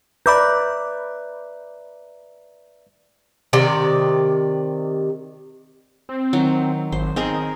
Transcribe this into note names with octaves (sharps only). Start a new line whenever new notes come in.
B4 D5 E5 A#5 B5 D6 G6
C3 D#3 D5
C4
D#3 F#3
G#1 C5
D#3 C4 G#4 A#4